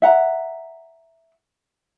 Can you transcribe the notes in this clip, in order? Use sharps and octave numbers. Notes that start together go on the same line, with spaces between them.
E5 F#5 A#5